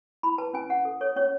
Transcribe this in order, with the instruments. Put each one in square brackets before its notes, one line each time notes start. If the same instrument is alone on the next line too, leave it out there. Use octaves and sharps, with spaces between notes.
[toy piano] E4 B5
B4 A5
C#4 G#5
C#4 F#5
A4
A4 C#5
C#4 C#5